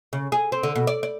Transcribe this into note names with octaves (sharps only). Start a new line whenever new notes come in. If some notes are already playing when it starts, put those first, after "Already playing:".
C#3
G#4
C4
D3
B2
D5
D5